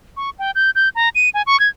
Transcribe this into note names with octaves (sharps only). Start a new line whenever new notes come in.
C#6
G5
G6
G6
A#5
D#7
G#5
C#6
G#6